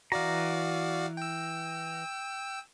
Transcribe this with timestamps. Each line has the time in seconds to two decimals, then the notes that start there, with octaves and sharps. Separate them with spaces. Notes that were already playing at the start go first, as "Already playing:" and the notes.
0.12 E3 F#4 D5 F5 A#5
1.17 G5 E6